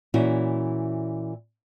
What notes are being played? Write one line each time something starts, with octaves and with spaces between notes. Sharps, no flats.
A#2 E3 C#4 E4 F#4